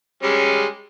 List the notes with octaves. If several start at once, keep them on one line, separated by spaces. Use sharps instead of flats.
G3 G#3 C#4